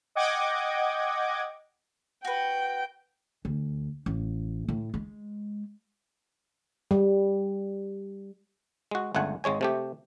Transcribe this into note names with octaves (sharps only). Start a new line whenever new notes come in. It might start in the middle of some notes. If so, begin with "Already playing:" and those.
D#5 F#5 G5 D6 G#6
F#4 B4 G5
D2
A1
A2
G#3
G3
G#3 F#4
G1 C#2 A3 F#5 G#5
G#1 G#3 C#5 G#5
C3 A3 G4